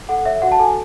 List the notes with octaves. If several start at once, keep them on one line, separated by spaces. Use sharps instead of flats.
A4 F#5
C#5 E5
F#4 F#5
A5
A4 G#5